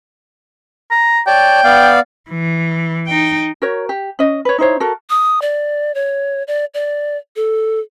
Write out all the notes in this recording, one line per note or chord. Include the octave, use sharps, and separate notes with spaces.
A#5
C#5 D5 G5 A5
B3 D5 F5
E3
D#4 G5
F#4 A#4 C#5
G4
C#4 D#5
B4 C#5
D#4 E4 C5 C#5
F#4 A4 A#4
D#6
D5
C#5
D5
D5
A4